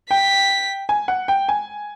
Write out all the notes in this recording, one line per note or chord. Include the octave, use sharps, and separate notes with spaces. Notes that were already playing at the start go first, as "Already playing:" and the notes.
G5 B6
G#5
F#5
G5
G#5